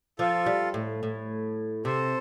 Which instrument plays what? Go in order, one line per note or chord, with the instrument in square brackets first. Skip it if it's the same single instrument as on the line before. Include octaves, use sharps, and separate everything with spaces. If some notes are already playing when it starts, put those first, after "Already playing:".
[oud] F3 [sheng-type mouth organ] F4 A4
[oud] G3
A2
A2
[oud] C3 [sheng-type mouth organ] A4 C5